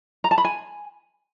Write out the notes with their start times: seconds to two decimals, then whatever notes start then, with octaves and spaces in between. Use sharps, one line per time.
0.24 A#5
0.31 A5
0.38 B5
0.45 G#5